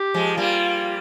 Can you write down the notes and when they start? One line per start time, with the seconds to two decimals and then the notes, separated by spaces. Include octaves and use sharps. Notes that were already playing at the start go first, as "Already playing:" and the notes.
Already playing: G4
0.14 F3 G#3
0.37 G3 A#3 F4